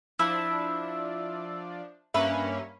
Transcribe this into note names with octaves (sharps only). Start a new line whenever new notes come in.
F3 D4 E4 E6
G2 A#3 C#4 B4 E5